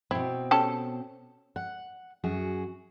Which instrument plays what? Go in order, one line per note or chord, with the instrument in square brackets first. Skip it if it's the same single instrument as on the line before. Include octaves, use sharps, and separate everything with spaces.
[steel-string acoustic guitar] B2 C4 [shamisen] E4
[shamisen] C#4 G4 A4
[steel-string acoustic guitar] F#5
F#2 F#4 G#4